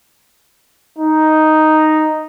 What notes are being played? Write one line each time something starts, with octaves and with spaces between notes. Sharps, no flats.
D#4